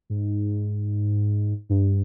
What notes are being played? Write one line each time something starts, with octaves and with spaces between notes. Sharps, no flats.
G#2
G2